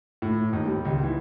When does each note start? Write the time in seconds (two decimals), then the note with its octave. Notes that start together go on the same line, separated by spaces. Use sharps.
0.22 A2
0.53 D#2
0.67 G3
0.85 C#2
1.03 E3